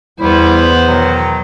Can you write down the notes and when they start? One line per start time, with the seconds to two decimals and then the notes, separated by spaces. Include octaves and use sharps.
0.20 E2 G3 B3 E4 C5
0.85 B2 D#3 F#3